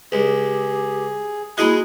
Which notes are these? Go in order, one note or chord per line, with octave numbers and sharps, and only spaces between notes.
C#2 G4 G#4
G#3 A#3 E4 F#4 D#5